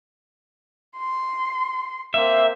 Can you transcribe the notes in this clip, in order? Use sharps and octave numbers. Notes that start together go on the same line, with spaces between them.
C6
A#3 C4 E5